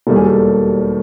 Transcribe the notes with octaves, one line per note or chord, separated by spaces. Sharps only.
E1 D#2 D#3 G3 A4
G#4
A4